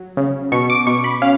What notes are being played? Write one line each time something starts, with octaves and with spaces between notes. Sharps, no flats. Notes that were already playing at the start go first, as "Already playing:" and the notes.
Already playing: F#3
C#3
B2 C#6
D6
B2 C#6
B5
C#4 F5